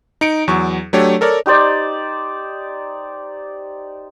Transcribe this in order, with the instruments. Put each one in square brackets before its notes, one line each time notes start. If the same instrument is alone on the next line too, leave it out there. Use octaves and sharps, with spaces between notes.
[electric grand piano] D#4 C#7 D7
E2 F#3 C#6
F#3 A3 D4 G4 A4 C#5
A4 A#4 C#5 D5
[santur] D#4 G4 C5 D5